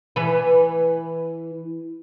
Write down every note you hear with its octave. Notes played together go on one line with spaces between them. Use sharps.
E3 B4